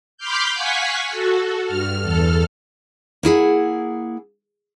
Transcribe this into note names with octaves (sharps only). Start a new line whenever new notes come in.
B5 C6 D6 F6 G6
F5 F#5 G#5 C#6 B6
F#4 A4
G2 F6
E2 A4 F6
A#3 E4 G#4 F#5